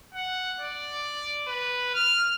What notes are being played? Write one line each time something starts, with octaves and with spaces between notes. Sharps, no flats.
F#5
D5
B4
F6